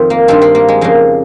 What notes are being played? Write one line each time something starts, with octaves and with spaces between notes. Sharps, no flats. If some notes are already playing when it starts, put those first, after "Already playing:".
Already playing: F2 D#3 C4
A#3
G2 D#3 C4
C4
A#3
G#3
F2 C#3 A#3